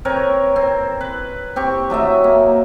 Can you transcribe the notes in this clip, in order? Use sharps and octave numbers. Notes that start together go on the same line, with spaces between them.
C4 A#4 B4 C#5
C4
B4
C4 G4 C#6
F#3 A3 D#5 E5
A#3